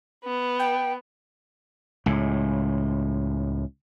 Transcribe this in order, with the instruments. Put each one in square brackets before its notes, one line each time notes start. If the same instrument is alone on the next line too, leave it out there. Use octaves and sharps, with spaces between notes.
[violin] B3
[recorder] G5
[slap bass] C#2 A2